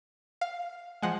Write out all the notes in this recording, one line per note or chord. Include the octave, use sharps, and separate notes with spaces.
F5
F3 G#3 F#5